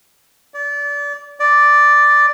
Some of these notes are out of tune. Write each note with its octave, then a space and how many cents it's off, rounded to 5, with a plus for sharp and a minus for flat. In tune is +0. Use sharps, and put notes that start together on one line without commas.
D5 -30
D5 +0